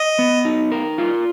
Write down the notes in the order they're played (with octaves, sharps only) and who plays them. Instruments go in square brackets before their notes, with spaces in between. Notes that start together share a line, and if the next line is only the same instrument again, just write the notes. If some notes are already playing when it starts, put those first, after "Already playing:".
Already playing: [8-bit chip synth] D#5
[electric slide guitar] B3
D#4
A#4
F4